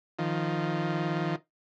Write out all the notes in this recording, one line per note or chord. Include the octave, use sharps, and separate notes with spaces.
D#3 F3